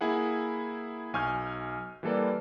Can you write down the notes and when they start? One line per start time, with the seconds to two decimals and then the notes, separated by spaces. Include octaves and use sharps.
0.01 A#3 E4 G#4 F#5
1.13 B1 G#5 C#6 F6 G6
2.03 E3 G3 A#3 A4 B4 D5